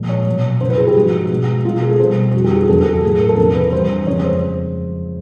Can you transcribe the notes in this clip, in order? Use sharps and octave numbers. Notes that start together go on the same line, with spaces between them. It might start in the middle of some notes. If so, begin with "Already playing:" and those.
Already playing: A#2 F3 G#3
C#5
B2 F#3
F#2 C#3 F#3 C5
B4
G#4
G4
G#2 F3 G#3 F#4
B2 G#3
B2 G#3 F4
G#4
A4
B2 G3 C5
F2 D3 G3 F#4
G4
G#4
E2 C#3 F#3 A4
A4
A2 F#3 G#4
A#4
A4
E2 C3 F3 A#4
B4
G2 E3 G3 C5
F2 C#3 F3 G#3 C#5
C5